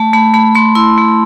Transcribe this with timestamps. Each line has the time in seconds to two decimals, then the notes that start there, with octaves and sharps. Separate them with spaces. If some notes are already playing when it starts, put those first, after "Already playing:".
Already playing: A3 A5
0.13 A3 B5
0.34 A3 B5
0.55 A3 C6
0.75 E4 C6
0.97 A3